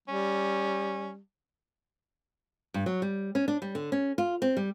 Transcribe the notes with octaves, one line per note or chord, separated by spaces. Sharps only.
G3 C#4
G2
F#3
G3
C#4
D4
G3
D3
C#4
F4
C4
G3